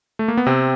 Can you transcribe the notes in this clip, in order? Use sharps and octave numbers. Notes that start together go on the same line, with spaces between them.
A3
A#3
B3
C3 C4